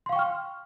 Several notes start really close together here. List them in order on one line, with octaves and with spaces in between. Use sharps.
C6 F5 C#6 G5 F6